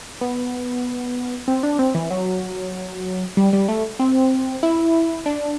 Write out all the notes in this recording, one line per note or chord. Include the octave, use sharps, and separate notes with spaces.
B3
C4
D4
C4
E3
F#3
G3
G3
A3
C4
E4
D4